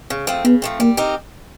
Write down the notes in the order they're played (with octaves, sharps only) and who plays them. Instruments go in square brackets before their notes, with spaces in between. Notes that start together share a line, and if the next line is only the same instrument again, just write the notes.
[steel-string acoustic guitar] C#3
F3 A3 C4
[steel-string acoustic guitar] C#3 [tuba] B3
[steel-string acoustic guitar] F3 A3 C4
[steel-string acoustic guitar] G3 [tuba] A#3
[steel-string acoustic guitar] C4 D#4 G4 A#4